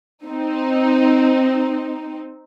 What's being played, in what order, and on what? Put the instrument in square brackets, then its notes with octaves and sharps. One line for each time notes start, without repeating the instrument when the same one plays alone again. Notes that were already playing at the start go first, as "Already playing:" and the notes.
[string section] C4 D#4